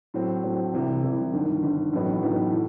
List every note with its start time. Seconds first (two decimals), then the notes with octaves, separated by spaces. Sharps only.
0.14 A2 F#3 C4
0.44 A2 F#3 C4
0.73 C2 C3 E3
1.03 C2 C3 E3
1.33 G1 G2 D#3
1.63 G1 G2 D#3
1.93 A1 A2 F#3 B3 D#4
2.23 A1 A2 F#3 B3 D#4
2.51 A2 E3